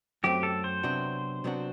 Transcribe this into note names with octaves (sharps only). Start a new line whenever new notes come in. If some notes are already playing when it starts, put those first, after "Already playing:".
F#2 F#3 A3 C4 G4
A4
C5
C3 F#3 B3 D4 F#4
C3 F#3 B3 D4 F#4